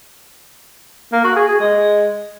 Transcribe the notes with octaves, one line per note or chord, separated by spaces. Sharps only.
A#3
F#4
G#4
G#4
G#3